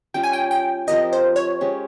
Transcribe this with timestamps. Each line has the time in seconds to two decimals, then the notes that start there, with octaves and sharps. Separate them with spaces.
0.14 G3 C#4 F4 G5
0.23 G#5
0.33 G5
0.51 G5
0.87 F3 C4 G4 A#4 D#5
1.13 C5
1.36 C#5
1.61 G#3 C#4 G4